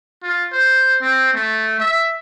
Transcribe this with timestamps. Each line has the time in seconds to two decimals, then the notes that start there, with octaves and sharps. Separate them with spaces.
0.23 F4
0.52 C5
1.01 C4
1.34 A3
1.80 E5